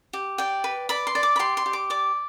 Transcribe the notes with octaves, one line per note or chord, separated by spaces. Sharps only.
G4
D5 G5
B4
D5 B5
C6
D5
D6
B5
G4 C6
C6
G4
D6
D5 D6